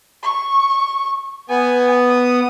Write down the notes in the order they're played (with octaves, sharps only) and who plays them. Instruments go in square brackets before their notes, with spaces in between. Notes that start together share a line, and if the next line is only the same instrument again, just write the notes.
[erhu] C#6
[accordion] B3 [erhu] G#5
[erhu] D#6